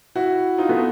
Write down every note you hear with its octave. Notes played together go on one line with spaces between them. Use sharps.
E4 F#4
D#4 F4
A3 B3